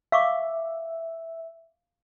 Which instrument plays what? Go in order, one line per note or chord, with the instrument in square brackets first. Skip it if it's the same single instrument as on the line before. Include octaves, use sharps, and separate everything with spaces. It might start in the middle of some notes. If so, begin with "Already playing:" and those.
[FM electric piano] E5 [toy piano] F5 C#6 D6